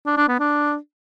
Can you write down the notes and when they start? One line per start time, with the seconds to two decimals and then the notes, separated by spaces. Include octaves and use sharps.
0.06 D4
0.17 D4
0.28 B3
0.40 D4